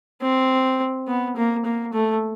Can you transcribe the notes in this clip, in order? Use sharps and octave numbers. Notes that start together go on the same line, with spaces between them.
C4
B3
A#3
A#3
A3